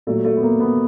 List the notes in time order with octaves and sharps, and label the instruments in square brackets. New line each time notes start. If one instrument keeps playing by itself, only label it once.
[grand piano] A#2 F#3 A3
A3
B3
A#3
B3